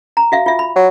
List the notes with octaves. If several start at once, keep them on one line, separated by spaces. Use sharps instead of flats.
A#5
F#4 E5 F5
F4 E5
B5
F#3